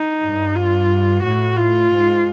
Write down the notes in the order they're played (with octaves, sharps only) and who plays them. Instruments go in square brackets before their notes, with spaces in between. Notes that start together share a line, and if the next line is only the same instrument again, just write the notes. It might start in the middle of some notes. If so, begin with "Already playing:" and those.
Already playing: [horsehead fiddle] D#4
[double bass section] G2
[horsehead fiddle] F4
[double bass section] A2 [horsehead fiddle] F#4
[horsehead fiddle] F4
[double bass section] G#2